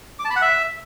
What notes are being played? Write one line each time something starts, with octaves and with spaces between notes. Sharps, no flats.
D6
A5
B5
F#5
E5